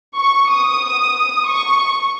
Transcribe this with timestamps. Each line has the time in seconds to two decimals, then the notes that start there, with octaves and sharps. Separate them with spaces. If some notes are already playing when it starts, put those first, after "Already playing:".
0.15 C#6
0.51 D#6
1.47 C#6